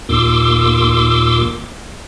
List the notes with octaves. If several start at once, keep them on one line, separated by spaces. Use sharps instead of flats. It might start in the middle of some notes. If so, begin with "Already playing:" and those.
D#2 A#2 C6 D6 E6